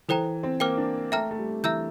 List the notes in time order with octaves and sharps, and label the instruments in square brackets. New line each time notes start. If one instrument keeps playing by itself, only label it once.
[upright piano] E3 [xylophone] A4 C5 G5 A#5
[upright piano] C4
[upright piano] A#3 [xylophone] C5 G5 D6 F6
[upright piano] D4
[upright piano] A3 [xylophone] E5 G5 A#5 F6
[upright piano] A3
G3
[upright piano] E3 [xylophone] E5 A#5 E6 G6